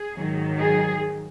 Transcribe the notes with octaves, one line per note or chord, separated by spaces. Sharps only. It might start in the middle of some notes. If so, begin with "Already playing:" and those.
Already playing: G#4
G#2 D#3 F#3
G#4